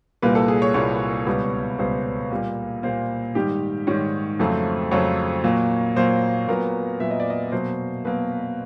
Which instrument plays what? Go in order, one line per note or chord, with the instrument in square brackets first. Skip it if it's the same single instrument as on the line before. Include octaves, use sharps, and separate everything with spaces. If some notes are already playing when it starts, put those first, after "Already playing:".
[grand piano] C2 A#2 G3 A#3 B4
A4
G#4
C#5
C2 A#2 G3 A#3 C#5
C#2 B2 G3 B3
C#2 B2 G3 B3 C5
A#2 G3 A#3
A#2 G3 A#3 C5
G#2 D#3 G3 G4
G#2 D#3 G3 C#5
F2 C#3 F#3 A3 C4
F2 C#3 F#3 A3 C4 C#5
A#2 F#3 A#3
A#2 F#3 A#3 C5
A#2 F#3 B3 A#4
A#2 F#3 B3 E5
D#5
D5
D#5
B2 F#3 A#3 C5
B2 F#3 A#3 B4